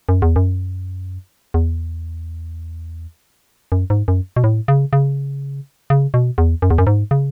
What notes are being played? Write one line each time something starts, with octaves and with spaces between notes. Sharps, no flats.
F#2
E2
F#2
E2
F#2
G#2
F#2
B2
A2
C#3
C#3
C#3
B2
E2
F#2
E2
F#2
G#2
C#3